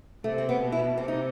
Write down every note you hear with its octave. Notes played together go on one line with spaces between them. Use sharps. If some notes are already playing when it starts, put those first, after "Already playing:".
C3 A3
C4
B3
B2
E4
C3 C4
D#4